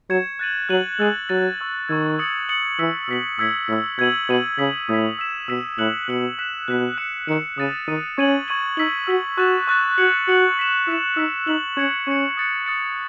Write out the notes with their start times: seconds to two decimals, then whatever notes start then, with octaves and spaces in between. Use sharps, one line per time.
0.10 F#3 C#6 G#6 C#7 E7
0.39 F#6 A6 D#7 F#7
0.69 F#3 F#6 A6 D#7 F#7
0.99 G#3 E6 A6 D#7 F#7
1.29 F#3 E6 A6 D#7 F#7
1.60 C#6 E6 G#6
1.89 D#3 C#6 E6 G#6
2.19 D#6 A6 C#7 F#7
2.49 D#6 A6 C#7 F#7
2.79 E3 E6 B6 F#7
3.09 B2 E6 B6 F#7
3.39 A2 E6 G#6 B6
3.68 A2 E6 G#6 B6
3.99 B2 G#6 D#7 F#7
4.29 B2 G#6 D#7 F#7
4.59 C#3 D#6 G#6 B6
4.89 A2 D#6 G#6 B6
5.18 E6 B6 E7
5.48 B2 E6 B6 E7
5.78 A2 F#6 C#7 F#7
6.08 B2 F#6 C#7 F#7
6.39 F#6 B6 E7
6.68 B2 F#6 B6 E7
6.98 F#6 C#7 E7
7.28 D#3 F#6 C#7 E7
7.58 C#3 D#6 A6 D#7
7.88 D#3 D#6 A6 D#7
8.18 C#4 C#6 G#6 D#7 F#7
8.48 C#6 G#6 D#7 F#7
8.77 D#4 E6 B6 F#7
9.07 F#4 E6 B6 F#7
9.38 F#4 C#6 F#6 A6 E7
9.68 C#6 F#6 A6 E7
9.97 F#4 G#6 C#7 F#7
10.27 F#4 G#6 C#7 F#7
10.58 E6 B6 E7
10.87 E4 E6 B6 E7
11.17 D#4 E6 B6 F#7
11.47 D#4 E6 B6 F#7
11.77 C#4 C#6 G#6 C#7
12.07 C#4 C#6 G#6 C#7
12.37 D#6 F#6 A6 C#7
12.66 D#6 F#6 A6 C#7